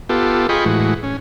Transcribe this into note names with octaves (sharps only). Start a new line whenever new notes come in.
B3 F4 G4 A4
F4 G#4 D#5 G5 B5 C#6
A2 E3 G#3 F#4
C#4